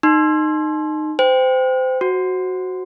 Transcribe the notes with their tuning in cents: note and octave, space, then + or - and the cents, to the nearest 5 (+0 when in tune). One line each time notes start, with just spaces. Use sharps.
D#4 -15 C6 +15
C5 -25 G5 +10
F#4 +0 C5 +5